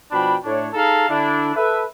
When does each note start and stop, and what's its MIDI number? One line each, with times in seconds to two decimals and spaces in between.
0.12 0.36 47
0.12 0.36 53
0.12 0.36 62
0.12 0.36 79
0.12 0.36 83
0.44 0.68 45
0.44 0.68 62
0.44 0.68 73
0.74 1.05 63
0.74 1.05 68
0.74 1.05 69
0.74 1.05 77
0.74 1.05 81
0.74 1.05 82
1.09 1.53 50
1.09 1.53 62
1.09 1.53 64
1.56 1.84 69
1.56 1.84 71
1.56 1.84 76